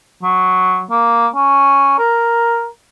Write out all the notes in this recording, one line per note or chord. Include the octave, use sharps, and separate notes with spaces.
F#3
A#3
C#4
A#4